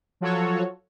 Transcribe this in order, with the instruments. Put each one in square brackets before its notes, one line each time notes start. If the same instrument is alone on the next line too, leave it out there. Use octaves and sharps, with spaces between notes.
[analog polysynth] F3 F#3 F4 F#4 A4 C#5